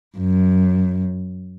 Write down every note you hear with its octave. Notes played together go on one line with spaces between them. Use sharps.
F#2